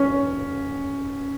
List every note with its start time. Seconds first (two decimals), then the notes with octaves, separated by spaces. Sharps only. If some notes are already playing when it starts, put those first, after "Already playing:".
Already playing: C#4